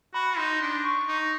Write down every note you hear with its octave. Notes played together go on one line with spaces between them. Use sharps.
F#4 B5
D#4 C6
D4
C#6
D#4